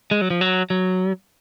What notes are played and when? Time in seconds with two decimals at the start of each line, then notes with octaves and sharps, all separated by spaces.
0.11 G#3
0.21 F#3
0.30 F3
0.41 F#3
0.70 F#3